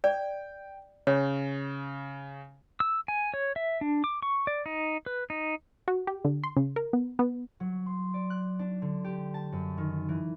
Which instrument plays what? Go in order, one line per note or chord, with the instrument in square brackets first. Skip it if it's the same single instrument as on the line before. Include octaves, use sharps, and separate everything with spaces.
[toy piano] D5 [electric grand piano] G5
[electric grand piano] C#3 [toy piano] C#5
[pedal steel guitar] E6
G#5
C#5
E5
D4
D6
C#6
D5
D#4
B4
D#4
[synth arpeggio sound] F#4
G4
D3
C6
C#3
A#4
B3
B3
[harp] F#3
C6
D5
F#6
D4
D3
G4
A5
F#2
D#3
E3